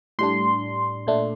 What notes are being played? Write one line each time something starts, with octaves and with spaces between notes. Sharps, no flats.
A2 G3 D4 C6
A#2 A3 D4